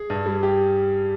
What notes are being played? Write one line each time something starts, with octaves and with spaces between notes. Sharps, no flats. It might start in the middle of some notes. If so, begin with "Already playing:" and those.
Already playing: G#4
G2
G3
G4